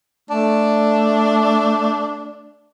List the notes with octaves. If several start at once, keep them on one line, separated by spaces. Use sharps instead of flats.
A3 D4